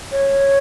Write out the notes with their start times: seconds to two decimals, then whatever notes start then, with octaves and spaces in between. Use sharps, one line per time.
0.12 C#5